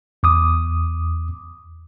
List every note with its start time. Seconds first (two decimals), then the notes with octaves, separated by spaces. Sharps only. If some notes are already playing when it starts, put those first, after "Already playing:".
0.23 E2 D6 D#6